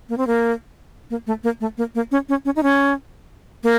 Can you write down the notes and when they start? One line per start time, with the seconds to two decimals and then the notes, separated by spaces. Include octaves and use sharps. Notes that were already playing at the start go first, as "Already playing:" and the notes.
0.09 A#3
0.18 C4
0.27 A#3
1.10 A#3
1.27 A3
1.44 A#3
1.60 A3
1.78 A#3
1.95 A#3
2.11 C#4
2.29 C#4
2.45 C#4
2.56 D#4
2.63 C#4
3.63 A#3